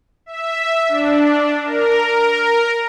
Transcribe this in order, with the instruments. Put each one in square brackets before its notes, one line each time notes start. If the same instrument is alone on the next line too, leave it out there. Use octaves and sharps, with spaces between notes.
[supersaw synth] E5
D4
A#4